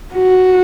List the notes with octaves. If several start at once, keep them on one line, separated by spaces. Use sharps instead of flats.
F#4